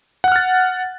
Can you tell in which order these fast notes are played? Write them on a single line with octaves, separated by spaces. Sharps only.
F#5 F#6 F6 A6